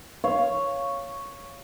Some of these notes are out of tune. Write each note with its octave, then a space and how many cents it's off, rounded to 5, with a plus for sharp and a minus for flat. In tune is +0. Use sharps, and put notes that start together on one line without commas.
C#5 +0 F5 -10